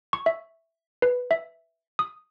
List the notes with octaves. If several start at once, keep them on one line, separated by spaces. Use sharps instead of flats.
C#6
E5
B4
E5
D#6